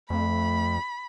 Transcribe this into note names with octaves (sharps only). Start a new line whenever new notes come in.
F2 A3 B5